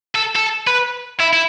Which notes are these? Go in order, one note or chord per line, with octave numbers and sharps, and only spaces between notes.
A4
A4
B4
E4
E4